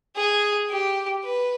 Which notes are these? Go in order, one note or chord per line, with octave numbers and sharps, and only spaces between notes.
G#4
G4
B4